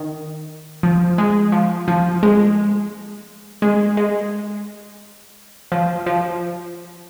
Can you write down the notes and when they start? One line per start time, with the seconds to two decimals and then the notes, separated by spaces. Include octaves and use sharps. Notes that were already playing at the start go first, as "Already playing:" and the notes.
Already playing: D#3
0.83 F3
1.18 G#3
1.52 F3
1.88 F3
2.23 G#3
3.62 G#3
3.97 G#3
5.72 F3
6.06 F3